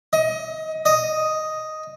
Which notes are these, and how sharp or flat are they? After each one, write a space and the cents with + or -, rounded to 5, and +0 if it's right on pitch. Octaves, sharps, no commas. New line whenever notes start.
D#5 +25
D#5 +5